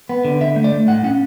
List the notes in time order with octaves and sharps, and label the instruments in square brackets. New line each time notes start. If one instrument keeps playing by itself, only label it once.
[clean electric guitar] B3
D3
D3 E5
A3
D5
A3
A2 F#5
C#4 F#5